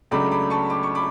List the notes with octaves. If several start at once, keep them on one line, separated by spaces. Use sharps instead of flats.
C#2 C#3 F#3 A3 D4 B5 D6
B5 D6
A5 C#6
D6
C#6
B5 D6